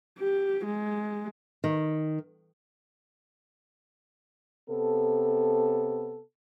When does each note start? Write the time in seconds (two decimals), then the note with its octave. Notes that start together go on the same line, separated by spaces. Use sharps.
0.19 G4
0.65 G#3
1.64 D#3
4.70 C3 B3 A4